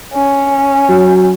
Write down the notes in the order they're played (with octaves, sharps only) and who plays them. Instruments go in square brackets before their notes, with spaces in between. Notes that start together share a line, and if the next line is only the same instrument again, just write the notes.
[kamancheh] C#4
[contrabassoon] F#3